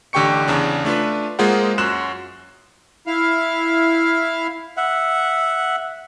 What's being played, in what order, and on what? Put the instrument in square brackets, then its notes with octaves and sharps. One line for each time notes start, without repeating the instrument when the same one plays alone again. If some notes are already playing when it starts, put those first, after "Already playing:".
[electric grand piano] A1 D3 G4 G5 C#6 C#7
E2 C#3 D4
A3 D4 F4 B4
G#3 A#3 F4 G#4 C5 F#5
F#2 F#4 C6 F#6 E7
[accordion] E4 F5
[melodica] E5 F#5